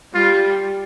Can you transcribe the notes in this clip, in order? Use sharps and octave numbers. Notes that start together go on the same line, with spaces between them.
G3 F4